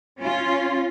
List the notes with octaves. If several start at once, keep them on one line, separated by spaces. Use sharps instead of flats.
C#4 F4